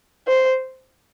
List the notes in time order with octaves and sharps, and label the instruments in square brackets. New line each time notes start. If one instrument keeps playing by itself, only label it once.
[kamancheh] C5